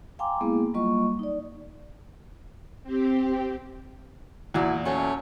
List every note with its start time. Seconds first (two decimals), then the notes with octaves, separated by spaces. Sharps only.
0.19 F5 G5 G#5 A#5 C6 D6
0.41 G#3 A#3 B3 E4 G#4
0.74 F#3 G3 A#3 F4 D#5 C#6
1.19 D#4 D5
2.84 C4 G4
4.54 E2 A#2 E4 F#4
4.85 F#3 A3 C#4